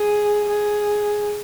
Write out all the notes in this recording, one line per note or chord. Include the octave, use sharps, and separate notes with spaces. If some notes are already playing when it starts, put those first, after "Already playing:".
Already playing: G#4
G#4